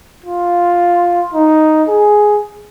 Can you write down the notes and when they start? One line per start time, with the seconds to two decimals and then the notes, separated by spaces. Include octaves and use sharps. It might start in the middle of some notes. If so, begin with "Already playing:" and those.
0.24 F4
1.33 D#4
1.89 G#4